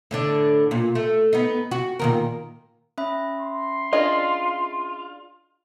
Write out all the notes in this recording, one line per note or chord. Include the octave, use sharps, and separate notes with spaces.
A2 D3 D4
A#2
A3
B3 D#4
F#4
A#2 D#3 A#4
C#4 E5 B5
C6
D4 F4 G#4 D#5